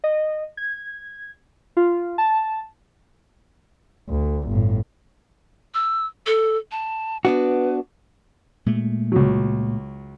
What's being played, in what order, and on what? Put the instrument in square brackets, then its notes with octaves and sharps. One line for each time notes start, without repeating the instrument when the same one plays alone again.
[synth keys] D#5
G#6
F4
A5
[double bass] D2
G1 A2
[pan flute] E6
A4
A5
[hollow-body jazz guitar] B3 D4 F#4 [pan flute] B4
[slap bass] A#2 G#3 A3
[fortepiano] C#2 F#3